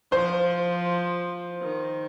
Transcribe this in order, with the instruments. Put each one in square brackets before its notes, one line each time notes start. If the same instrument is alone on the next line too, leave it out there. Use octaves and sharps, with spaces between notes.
[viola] F3 [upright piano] C5
[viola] D#3